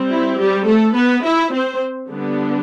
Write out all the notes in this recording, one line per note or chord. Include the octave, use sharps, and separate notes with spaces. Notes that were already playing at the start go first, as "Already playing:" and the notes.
Already playing: G3 C4
E4
G3 G4
A3 A4
B3 B4
E4 E5
C4 C5
D3 G3 B3 D4